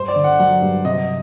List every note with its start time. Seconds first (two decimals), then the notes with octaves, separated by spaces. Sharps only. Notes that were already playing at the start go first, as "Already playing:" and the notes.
Already playing: G2 C5
0.08 D5
0.16 D3
0.24 F#5
0.40 F#3 F#5
0.63 G2
0.85 C3 D#5